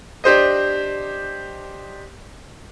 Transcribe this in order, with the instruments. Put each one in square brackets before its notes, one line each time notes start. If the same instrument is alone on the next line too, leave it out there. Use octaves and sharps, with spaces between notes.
[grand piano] D4 G4 C5 D#5